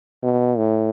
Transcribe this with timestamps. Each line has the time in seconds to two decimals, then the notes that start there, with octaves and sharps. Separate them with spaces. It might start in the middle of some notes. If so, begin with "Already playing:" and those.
0.23 B2
0.58 A2